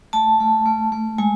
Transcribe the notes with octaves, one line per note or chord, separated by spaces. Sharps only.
A3 A5
A3
A3
A3
G#3 G#5